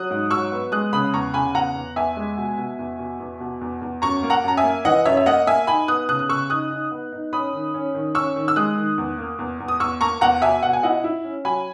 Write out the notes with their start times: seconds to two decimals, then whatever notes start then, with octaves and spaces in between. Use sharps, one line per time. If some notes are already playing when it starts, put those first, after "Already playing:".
Already playing: F#3 D#6 F#6
0.10 G#2
0.30 F#3 C#6 E6
0.52 B3
0.72 G#3 D#6 F#6
0.93 C#3 B5 D#6
1.13 E2 A#5 C#6
1.34 C#3 G#5 B5
1.55 E2 F#5 A#5
1.75 E2
1.96 E2 E5 G#5
2.17 G#3
2.37 B2
2.58 B2
2.79 E2
2.99 B2
3.20 E2
3.40 B2
3.61 E2
3.82 E2
4.02 F#2 A#5 C#6
4.23 A#3
4.30 F#5 A#5
4.44 F#2 A#5
4.57 E5 G#5
4.64 A#3
4.85 E3 D#5 F#5
5.05 F#2 C#5 E5
5.17 E5
5.26 A#3 D#5 F#5
5.47 A#3 E5 G#5
5.67 D#4 G#5 B5
5.88 B3 D#6 F#6
6.09 C#3 D#6 F#6
6.19 D#6
6.29 C#3 C#6 E6
6.50 D#4 D#6 F#6
6.70 D#4
6.91 B3
7.12 D#4
7.33 C#4 B5 D#6
7.53 D#3
7.74 C#4
7.94 D#3
8.15 C#4 C#6 E6
8.36 D#3
8.48 E6
8.56 G#3 D#6 F#6
8.77 D#3
8.98 E2
9.18 A#3
9.39 E2
9.60 E2
9.68 D#6
9.80 E2 C#6 E6
10.01 A#3 A#5 C#6
10.21 E2 F#5 A#5
10.42 B2 E5 G#5
10.63 B2 F#5
10.73 G#5
10.83 E4 D#5 F#5
11.04 E4
11.24 C#4
11.45 F#3 G#5 B5